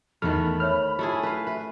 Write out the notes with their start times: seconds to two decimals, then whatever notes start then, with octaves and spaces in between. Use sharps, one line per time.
0.22 E2 D#3 A3 B4 B5 F6
0.60 C5 C#5 E5 F6
0.99 A3 E4 F4 G#4
1.23 B4 F5
1.47 B4 E5